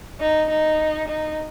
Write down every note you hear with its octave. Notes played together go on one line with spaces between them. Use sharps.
D#4
D#4
D#4